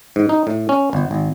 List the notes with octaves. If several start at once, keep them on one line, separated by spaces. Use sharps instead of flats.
G#2
D#4
A2
C#4
G1
G#1